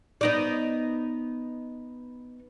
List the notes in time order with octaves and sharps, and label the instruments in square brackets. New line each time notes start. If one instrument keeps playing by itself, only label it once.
[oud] B3 D#4 D5